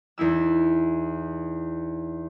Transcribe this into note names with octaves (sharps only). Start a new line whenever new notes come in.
E2 D#4 E4 E6